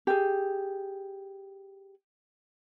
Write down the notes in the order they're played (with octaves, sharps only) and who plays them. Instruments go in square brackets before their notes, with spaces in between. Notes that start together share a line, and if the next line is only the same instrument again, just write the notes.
[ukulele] G4 G#4